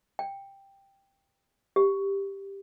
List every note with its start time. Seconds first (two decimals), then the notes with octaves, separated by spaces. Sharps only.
0.19 G5
1.76 G4